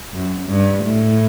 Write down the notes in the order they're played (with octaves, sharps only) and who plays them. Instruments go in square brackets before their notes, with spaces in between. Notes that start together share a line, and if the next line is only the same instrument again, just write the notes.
[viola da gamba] F#2
G2
A2